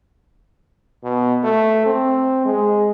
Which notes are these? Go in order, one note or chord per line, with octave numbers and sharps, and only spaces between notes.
B2
A3
C4
G#3